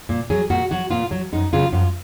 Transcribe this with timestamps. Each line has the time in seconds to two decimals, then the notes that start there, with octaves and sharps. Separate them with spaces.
0.09 A#2
0.30 F#3 G#4
0.50 A#2 F#4
0.71 F#3 F#4
0.91 A#2 F4
1.11 F#3
1.33 F#2 D#4
1.53 C#3 F#3 F4
1.72 F#2 F4